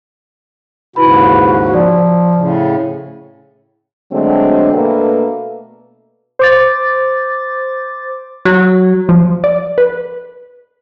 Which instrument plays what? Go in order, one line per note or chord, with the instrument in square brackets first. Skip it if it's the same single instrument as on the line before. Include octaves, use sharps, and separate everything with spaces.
[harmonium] D#2 G#2 C#3 [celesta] E4 B4 B5 [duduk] F#4
[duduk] F3 [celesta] D5
[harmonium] A2 C#3
[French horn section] D3 F#3 G#3 A3 C4 D4
B2 A3 A#3 D4 A4 B4
[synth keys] C5 D6 A6
[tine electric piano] F#3
[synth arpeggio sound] F3
D5
B4